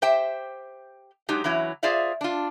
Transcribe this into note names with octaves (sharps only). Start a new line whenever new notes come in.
G4 C5 E5 G5
F#3 G#3 D#4 G4
E3 F#3 C#4 E4 C#5
F4 G#4 C5 D5 E5 F5
D4 F4